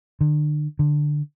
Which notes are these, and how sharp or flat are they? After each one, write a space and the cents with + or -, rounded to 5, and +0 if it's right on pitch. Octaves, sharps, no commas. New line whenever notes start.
D3 +40
D3 +10